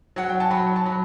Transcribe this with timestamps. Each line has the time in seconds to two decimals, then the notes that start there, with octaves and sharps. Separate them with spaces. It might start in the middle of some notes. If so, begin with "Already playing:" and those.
0.16 F#3 F#5
0.29 G5
0.40 A5
0.50 F#3 B5
0.76 A5
0.85 F#3 B5